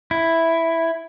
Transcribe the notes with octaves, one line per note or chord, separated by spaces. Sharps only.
E4